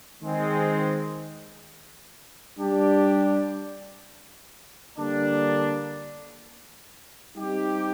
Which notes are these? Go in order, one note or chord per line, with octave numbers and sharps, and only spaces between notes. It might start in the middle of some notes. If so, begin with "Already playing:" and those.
D#3 G#3 C4
G3 D4 G4
D3 G3 A#3 D4
G3 C4 D#4 G4